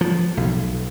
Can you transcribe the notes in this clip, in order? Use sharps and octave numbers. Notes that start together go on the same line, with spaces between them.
F3
B1